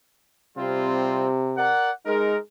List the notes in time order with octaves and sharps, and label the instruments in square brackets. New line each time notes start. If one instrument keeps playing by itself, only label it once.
[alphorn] C3 [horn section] G3 C4 F4
[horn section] A#4 D5 F#5
[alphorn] G#3 [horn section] D#4 A#4